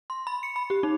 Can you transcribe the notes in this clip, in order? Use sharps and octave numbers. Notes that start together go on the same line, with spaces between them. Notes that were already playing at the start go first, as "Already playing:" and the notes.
C6
B5
C#7
B5
G4
D#4